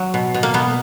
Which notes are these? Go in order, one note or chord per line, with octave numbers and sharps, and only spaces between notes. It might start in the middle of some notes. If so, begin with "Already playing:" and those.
Already playing: F#3
B2
B2
A#3
B2 B3